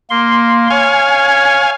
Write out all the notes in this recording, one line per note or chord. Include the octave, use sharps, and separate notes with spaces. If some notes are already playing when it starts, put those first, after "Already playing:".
A#3 C6
C#5 F5 G#5